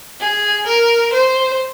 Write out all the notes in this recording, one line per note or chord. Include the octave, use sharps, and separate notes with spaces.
G#4
A#4
C5